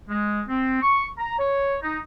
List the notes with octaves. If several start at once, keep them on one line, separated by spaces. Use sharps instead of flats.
G#3
C4
C#6
A#5
C#5
D#4